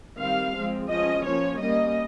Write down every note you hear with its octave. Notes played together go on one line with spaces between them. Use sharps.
D#3 G3 C4 F5
F3 G#3 C4
F3 G#3 C#4 D#5
F3 A#3 C#4 C#5
G3 A#3 C#4 D#5